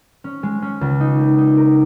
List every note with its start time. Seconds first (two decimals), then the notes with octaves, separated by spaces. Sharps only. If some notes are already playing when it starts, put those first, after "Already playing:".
0.24 C#4
0.43 G#3
0.62 C#4
0.81 C#2
1.00 D#4
1.19 A#3
1.38 D#4
1.57 A#4